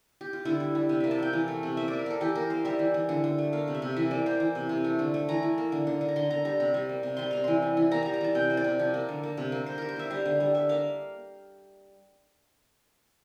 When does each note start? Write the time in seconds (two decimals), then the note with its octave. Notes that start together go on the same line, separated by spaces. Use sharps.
0.21 G4
0.33 F4
0.45 D3 E4
0.60 G3
0.75 G3
0.89 C3
1.00 A#3 E5
1.11 A5
1.19 F3 G5
1.33 E3 F5
1.48 A3
1.63 C3
1.77 A#3 E5
1.88 A#3 D5
1.99 A#4
2.06 A#3 A4
2.20 E3 G4
2.35 A#3 A#4
2.50 A#3 C5
2.65 G3 E5
2.79 E3
2.94 E3
3.09 D3
3.24 D3
3.38 A3
3.53 A#3 F5
3.68 C3
3.75 E5
3.82 C3
3.96 E3 E5
4.11 A#3 D5
4.26 A#3 C5
4.40 E3
4.55 C3
4.69 C3
4.84 A3
4.99 D3
5.14 A3
5.29 E3 A#5
5.43 E3
5.58 A#3
5.72 D3
5.87 D3
6.01 D3
6.09 A#5
6.16 D3 C6
6.31 D3 A#5
6.45 G3 A#5
6.60 C3 A#5
6.74 G3
6.89 A#3
7.03 C3
7.17 G3 C6
7.31 C3 A#5
7.44 E3 C6
7.62 G3
7.77 E3
7.91 A#3 A#5
8.03 G3 A#5
8.14 A#5
8.21 E3 A5
8.35 C3 G5
8.50 A#3 C5
8.57 D5
8.64 C3
8.79 F3
8.94 A#3
9.09 D3
9.23 A#3
9.37 C3
9.52 A#3
9.66 G3 C5
9.78 G3 A#4
9.89 C5
9.96 A#3 E5
10.10 G3 F5
10.26 D3
10.40 G3
10.54 G3 E5
10.69 A#3 F5